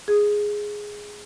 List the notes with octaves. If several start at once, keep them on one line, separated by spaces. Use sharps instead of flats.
G#4